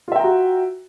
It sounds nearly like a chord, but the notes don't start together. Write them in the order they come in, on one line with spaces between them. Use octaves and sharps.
F4 E5 G5 A#5 F#4